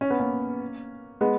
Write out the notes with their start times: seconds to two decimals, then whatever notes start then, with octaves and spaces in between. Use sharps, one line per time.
0.01 C#4
0.10 B3
0.20 A#3 C#4
1.21 G#3 B3